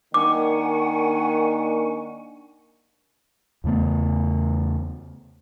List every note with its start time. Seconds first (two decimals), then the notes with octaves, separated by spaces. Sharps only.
0.14 D#3 A#3 D4 F#5 G#5 C#6 D6
3.64 E2 C#3 A3 B3